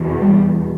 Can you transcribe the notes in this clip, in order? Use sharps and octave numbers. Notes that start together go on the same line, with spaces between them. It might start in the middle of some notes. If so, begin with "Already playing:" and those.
Already playing: E2 B2
G3